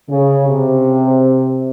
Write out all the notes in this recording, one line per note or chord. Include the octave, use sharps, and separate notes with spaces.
C#3
C3